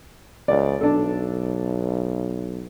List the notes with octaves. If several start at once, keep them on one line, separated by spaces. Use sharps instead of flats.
C#2 D5
B1 D4 A4